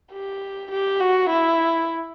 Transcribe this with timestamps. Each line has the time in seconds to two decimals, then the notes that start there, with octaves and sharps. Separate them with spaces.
0.13 G4
0.71 G4
1.00 F#4
1.29 E4